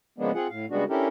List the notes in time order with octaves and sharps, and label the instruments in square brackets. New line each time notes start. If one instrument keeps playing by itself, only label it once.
[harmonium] C#3 F3 G#3 A#3 B3 D4
C4 F4 G#4 F#5
A2 F5
C#3 G3 G#3 B3 D4 F#4
C#4 D4 E4 G4 A4 A#4